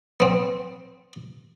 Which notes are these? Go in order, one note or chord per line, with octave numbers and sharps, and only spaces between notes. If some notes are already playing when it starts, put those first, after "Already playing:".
B3 C4